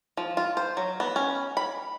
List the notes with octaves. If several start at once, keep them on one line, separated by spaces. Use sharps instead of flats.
F3
F4
C5
F#3
B3
C#4
B5